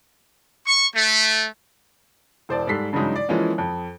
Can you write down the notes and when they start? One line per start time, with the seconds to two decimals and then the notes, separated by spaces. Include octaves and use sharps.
0.67 C#6
0.95 A3
2.49 E1 C5 D5 A5
2.68 G#2 G3 A4 B6 C7
2.93 G2 C#3 E3 F#3 G#3 D#4
3.16 D5
3.29 E3 F3 G#3 A#3 C#4 F4
3.58 F2